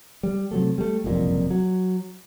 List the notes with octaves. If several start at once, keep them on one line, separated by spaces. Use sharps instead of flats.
G3
C3 F#3 A3
G3 A3
F#1 C2 F2 A#2
F#3